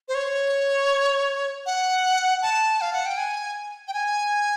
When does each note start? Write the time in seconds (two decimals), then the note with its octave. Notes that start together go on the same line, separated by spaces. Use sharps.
0.08 C5
0.15 C#5
1.66 F#5
2.42 A5
2.81 F5
2.93 F#5
3.06 G5
3.17 G#5
3.88 G5
3.94 G#5